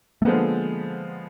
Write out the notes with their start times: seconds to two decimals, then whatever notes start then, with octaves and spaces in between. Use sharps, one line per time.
0.22 A3
0.25 D3 F3 G#3 A#3 B3